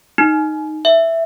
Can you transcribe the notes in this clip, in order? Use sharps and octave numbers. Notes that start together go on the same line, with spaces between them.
D#4
E5